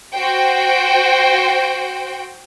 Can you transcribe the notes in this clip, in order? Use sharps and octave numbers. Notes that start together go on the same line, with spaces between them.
F#4 C5 G5